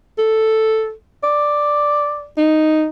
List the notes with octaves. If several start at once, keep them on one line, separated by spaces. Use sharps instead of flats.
A4
D5
D#4